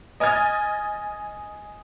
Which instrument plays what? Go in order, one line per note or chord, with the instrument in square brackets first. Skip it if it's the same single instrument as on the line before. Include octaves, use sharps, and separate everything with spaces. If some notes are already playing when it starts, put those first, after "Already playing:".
[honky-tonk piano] D#5 G#5 D#6 F6 G#6 A6